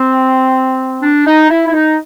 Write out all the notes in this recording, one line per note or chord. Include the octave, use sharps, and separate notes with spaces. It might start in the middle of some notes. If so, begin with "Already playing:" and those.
Already playing: C4
D4
D#4
E4
E4
D#4